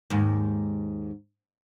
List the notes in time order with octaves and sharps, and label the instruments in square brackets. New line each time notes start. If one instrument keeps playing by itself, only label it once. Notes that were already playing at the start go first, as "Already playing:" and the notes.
[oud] D#2 G#2